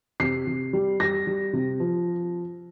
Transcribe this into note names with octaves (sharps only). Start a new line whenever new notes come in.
C3 C7
C3
G3
G3 A#6
G3
C3
F3